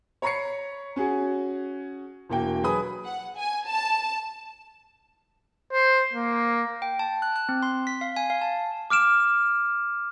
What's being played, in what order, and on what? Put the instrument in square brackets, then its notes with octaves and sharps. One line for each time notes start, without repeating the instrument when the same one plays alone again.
[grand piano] C#5 A#5 B5 C#6 C7 C#7
C#4 F#4 G#4 F#5
E1 E3 A#3 F#4 G5
F#3 G#4 B4 B5 D#6
[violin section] F#5
G#5
A5
[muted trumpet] C5
A#3
[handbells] G5
A5
F#6
F#6
C4
C6
B6
F5
G#5
F5
A5
[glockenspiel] D6 F6 D7 E7